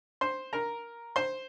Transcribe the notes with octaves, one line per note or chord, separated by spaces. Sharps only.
C5 C6
A#4 A#5
C5 C6